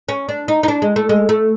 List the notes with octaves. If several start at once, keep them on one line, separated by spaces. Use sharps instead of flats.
C#4
D4
D#4
D#4
D4
G#3
A3
G#3
A3